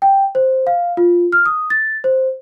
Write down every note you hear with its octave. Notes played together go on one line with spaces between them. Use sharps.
G5
C5
F5
F4
F6
D#6
A6
C5